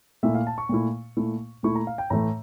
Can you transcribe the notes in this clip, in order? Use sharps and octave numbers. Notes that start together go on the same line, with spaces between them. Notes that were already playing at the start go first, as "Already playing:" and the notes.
A#2 A3 E4 E5
F5
A5
C#6
A#2 A3 E4
A#2 A3 E4
A#2 A3 E4 C#6
A#5
F5
G5
A2 E3 A3 A#5